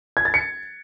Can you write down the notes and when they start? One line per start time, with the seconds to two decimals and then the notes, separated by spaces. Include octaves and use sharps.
0.17 G#6
0.25 A6
0.34 C#7